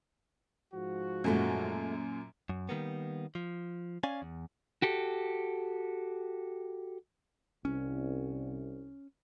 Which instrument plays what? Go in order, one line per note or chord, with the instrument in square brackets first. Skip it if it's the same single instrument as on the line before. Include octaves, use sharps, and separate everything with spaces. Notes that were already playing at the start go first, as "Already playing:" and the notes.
[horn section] G#2 F3 F#4
[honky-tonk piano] F#2 A#2 [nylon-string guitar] G#3 A3 A4
[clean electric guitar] F#2
D#3 G3 A#3 B3
F3
C#4 D5 F5 G#5
E2
F#4 G4 A4
[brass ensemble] C2 [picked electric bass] C#4